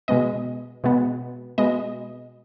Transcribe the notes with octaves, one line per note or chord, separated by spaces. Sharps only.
B2 G#3 B3 D#5
B2 G#3 B3
B2 G#3 B3 D#5